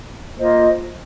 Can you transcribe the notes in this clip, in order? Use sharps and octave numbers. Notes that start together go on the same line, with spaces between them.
A#3 F4 C5 D#5